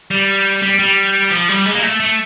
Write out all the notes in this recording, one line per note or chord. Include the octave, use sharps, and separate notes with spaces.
G3
G3
G3
F3
G3
G#3
A#3
A3
A3